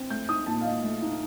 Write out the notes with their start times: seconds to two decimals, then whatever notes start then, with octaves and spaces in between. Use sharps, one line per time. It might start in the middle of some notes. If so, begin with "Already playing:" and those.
Already playing: C4
0.10 A3 G6
0.29 D#4 D#6
0.47 A#2 A5
0.61 F5
0.65 A#2 D#5
0.83 A3
1.02 D#4